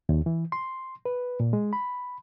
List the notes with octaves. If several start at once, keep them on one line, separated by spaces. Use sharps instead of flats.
D#2
E3
C6
B4
A#2
G#3
B5